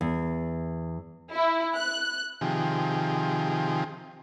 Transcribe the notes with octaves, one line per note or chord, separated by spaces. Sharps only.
E2
E4
F#6
C3 D#3 F3 G4 G#4